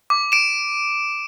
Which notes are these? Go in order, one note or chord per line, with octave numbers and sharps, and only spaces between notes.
D6
D7 E7